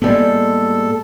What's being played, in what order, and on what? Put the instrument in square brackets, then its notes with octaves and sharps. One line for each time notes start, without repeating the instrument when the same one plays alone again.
[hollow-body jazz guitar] A2 G3 G#3 [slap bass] A#3 B3 [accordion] A4